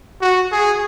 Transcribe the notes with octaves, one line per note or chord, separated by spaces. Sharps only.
F#4
G#4